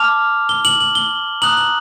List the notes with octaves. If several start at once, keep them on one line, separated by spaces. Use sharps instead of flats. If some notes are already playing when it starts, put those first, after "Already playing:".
Already playing: A5 D6 F6 F7
G7
F#7
F#7
G7
A#5 D#6 F#6 F#7
F#7